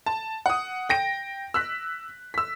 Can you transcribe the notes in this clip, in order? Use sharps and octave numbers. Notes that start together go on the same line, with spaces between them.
A5
F#5 D#6
G5 A#6 D7
E6 F#6 B6
E6 B6